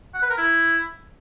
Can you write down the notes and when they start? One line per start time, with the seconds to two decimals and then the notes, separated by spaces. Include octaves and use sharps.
0.15 F#5
0.22 B4
0.30 A#4
0.38 E4